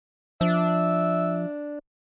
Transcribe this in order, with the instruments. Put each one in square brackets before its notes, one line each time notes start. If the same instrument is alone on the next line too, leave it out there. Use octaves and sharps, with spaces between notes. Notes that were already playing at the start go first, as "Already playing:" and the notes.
[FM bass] F3 [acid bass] D4 [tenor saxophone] E5